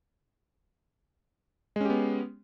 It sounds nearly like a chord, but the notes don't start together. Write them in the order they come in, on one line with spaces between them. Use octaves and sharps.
G#3 C#4 G4 B3